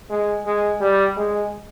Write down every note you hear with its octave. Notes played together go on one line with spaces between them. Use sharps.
G#3
G#3
G3
G#3